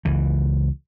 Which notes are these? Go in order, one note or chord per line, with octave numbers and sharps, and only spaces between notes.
C#2 E3